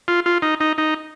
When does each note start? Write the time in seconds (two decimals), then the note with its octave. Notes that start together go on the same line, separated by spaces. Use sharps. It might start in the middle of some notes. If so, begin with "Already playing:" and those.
0.08 F4
0.26 F4
0.42 D#4
0.60 D#4
0.78 D#4